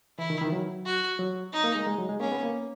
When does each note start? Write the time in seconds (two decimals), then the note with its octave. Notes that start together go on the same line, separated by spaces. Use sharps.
0.18 E3 E4
0.30 D#3
0.41 D#3
0.47 E3
0.52 F#3
0.86 F#4
1.19 F#3
1.53 D#4
1.64 A#3
1.75 G#3
1.87 G#3
1.98 F#3
2.09 G#3
2.20 A#3 C#4
2.32 B3
2.43 A#3